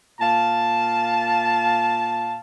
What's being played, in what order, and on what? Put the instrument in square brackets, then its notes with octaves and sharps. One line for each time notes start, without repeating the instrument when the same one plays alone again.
[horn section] A#2 F5 A5